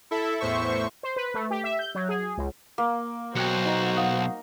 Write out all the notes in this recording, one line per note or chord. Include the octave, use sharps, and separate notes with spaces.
E4 A4 E5
E2 A2 C5 E5 C#6
C5
B4
A3
G4
E5
G6
F#3
G#4
C#2
A#3 D6
B1 F#4 C5 G5 F#6 C#7
D#4 A#5
F5 F#5 D#6